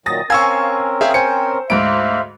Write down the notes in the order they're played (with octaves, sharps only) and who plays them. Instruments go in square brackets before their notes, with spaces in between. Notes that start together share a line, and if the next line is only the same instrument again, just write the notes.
[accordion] A#2 D#3 F#3 [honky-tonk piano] D#6 A6 A#6
[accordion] C4 C#4 A#4 [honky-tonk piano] F5 G#5 [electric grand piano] C#6 E6 G#6
[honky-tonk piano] G#4 [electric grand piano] E5 F5 G5
[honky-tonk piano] C5 [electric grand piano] G5 G#5 C#7
[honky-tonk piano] D2 G#2 [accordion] C5 E5 F5 [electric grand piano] D7